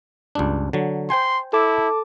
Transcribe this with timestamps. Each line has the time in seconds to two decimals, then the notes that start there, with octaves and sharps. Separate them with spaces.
0.35 C#2 G2 D4
0.73 D3 F#3
1.10 C5 G5 G#5 C6
1.53 E4 A4 A5 D6